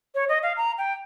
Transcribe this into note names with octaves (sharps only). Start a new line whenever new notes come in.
C#5
D#5
F5
A#5
G5